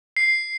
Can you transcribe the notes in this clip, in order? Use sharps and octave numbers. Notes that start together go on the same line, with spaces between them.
C7